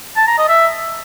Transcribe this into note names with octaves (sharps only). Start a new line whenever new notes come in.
A5
A#5
D#5
E5